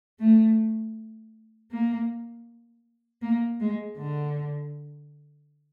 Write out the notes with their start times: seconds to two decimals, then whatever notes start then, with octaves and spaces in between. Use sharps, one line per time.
0.20 A3
1.71 A#3
3.22 A#3
3.60 G#3
3.98 D3